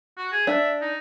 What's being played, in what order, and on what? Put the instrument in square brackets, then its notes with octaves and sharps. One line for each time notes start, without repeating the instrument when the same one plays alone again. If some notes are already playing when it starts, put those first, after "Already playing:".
[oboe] F#4
G#4
[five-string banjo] D4 [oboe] E5
[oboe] D#4